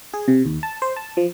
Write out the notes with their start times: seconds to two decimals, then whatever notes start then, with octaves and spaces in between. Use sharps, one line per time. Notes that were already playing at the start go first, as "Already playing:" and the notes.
0.14 G#4
0.28 C3
0.46 D#2
0.63 A5
0.82 C5
0.97 A5
1.17 F3